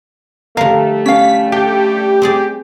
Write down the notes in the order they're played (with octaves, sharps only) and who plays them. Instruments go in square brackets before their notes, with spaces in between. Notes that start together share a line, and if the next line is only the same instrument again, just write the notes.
[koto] D3 F3 A#4 [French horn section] G3 A3 [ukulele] F5
[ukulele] C#4 F5 [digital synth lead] B6
[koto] D4 [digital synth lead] G4
[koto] C4 G#4 D5